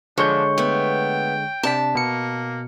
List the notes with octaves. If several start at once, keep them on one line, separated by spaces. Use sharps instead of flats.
D3 F3 G#3 D4 C#5 G6
A3 B3 G5
C3 D4 A5 B6
B2 A#3 C#7